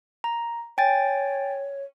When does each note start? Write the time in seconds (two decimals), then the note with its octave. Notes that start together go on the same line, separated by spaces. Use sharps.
0.24 A#5
0.78 C#5 G5 G#5 A6